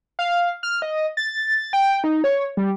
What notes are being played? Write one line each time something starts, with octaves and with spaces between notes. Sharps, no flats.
F5
F6
D#5
A6
G5
D#4
C#5
G3